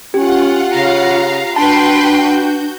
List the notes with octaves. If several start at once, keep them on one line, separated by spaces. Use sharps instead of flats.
C#4 F4 G4 F#5
C#3 F5 A#5
D4 F#4 B4 G5 A5 C6 G6